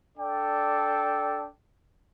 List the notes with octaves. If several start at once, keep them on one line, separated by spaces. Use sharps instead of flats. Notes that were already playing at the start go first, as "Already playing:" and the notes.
D4 A4 D5 G5